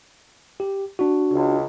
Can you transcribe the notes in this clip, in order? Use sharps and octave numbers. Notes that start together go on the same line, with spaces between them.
G4
D4 F#4
C#2